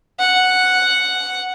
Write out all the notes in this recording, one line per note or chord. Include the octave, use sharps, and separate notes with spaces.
F#5